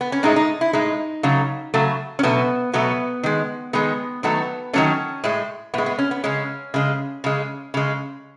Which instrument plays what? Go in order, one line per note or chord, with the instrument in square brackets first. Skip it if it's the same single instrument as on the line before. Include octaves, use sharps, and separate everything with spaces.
[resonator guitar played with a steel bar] B3
C#4
A2 G#3 D#4
D#4
E4
A2 G#3 D#4
C#3 F#3 A3
C#3 F#3 A3
C#4
B2 F#3 A3 B3
B2 F#3 A3 B3
D#3 G#3
D#3 G#3 B3
D#3 F#3 A3 B3
D#3 F#3 A3 C#4
A2 G#3
A2 G#3 B3
B3
C#4
B3
C#3 G#3 C#4
C#3 G#3
C#3 G#3
C#3 G#3